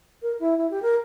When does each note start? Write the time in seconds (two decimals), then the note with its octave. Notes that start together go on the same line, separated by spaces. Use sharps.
0.22 A#4
0.40 E4
0.58 E4
0.70 G4
0.82 A#4